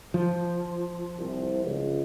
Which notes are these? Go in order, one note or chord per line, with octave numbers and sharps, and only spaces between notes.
F3
C2
C#2